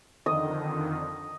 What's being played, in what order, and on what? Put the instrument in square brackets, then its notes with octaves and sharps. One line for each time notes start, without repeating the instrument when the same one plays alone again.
[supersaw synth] F2 D3 D#3 [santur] D#5